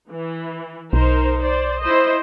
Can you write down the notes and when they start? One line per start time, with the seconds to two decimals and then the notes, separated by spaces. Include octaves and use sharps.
0.11 E3
0.93 B1 D#4 A#4 C5
1.42 C5 D5
1.82 E4 C5 D#5